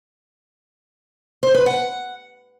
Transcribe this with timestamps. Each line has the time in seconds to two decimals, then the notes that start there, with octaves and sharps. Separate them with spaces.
1.43 C5
1.54 B4
1.66 F#5